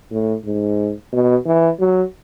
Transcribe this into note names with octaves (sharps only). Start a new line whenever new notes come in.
A2
G#2
B2
E3
F#3